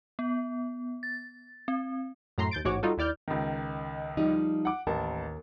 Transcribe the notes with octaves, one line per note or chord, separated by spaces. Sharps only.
B3
A6
C4
F#2 A2 A#5 C6 C7
D#2 G6 A6 D7
A1 G#2 F#4 C#5 D6
G3 D#4 F4 F#4 A4
D#2 E4 D5 F6 G6
C#2 D#3
F3 G3 D#4
F#5 D6
A1 D#2 A#4 A5